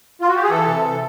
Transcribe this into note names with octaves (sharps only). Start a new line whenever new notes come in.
F4
F#4
G4
G#4
E3 A4
C3
E3